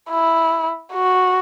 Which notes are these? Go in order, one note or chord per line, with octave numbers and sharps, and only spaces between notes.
E4
F#4